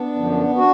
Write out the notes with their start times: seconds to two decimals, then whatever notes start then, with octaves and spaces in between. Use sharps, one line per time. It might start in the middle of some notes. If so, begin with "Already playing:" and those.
Already playing: B3 D4
0.15 F#2 D3 F3
0.55 D4 F#4